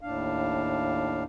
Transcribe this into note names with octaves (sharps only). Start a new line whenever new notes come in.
D#2 A2 D4 F5